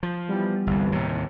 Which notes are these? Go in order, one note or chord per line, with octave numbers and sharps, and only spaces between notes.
F3
E3 G3 B3
G1 C2
D#2 A2 C3